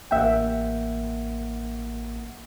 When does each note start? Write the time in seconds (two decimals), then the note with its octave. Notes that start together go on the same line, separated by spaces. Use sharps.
0.11 A1 A#3 E5 F#5 G5